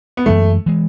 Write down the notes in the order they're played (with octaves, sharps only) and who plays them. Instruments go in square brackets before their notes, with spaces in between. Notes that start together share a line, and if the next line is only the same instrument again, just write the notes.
[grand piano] B3
[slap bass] F#2 E3 G#3 [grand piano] A3
[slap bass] E3 G#3